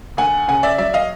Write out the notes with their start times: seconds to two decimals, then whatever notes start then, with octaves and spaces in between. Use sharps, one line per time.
0.17 D2 F#5 G#5
0.48 C#3 F#5 G#5
0.63 D5 E5
0.78 F#3 D5 E5
0.94 D#5 F5